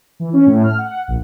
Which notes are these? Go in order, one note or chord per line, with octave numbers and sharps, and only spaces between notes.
E3
C#4
A2
F6
F#5
A#1